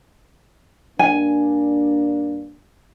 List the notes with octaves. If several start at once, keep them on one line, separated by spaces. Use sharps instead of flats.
G2 A#3 D4 G#5